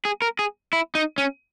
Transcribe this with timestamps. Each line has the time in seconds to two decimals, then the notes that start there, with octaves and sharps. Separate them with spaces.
0.05 G#4
0.22 A#4
0.39 G#4
0.73 E4
0.95 D#4
1.18 C#4